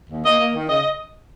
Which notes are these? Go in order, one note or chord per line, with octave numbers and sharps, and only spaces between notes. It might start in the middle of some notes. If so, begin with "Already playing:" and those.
D#2
A#3 D#5
A#3
D#3
C#3 D#5